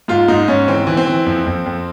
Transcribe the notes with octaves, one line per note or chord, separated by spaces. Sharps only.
G#2 F4
G#2 D#4
G#2 C#4
E3 C4
E3
C4
E3
F2
F2
F2